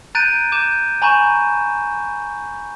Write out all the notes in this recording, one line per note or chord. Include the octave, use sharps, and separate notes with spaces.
A#5 F#6 G6 A6 D7 D#7
D6 G6 E7
G#5 A#5 B5 C#6 G6 E7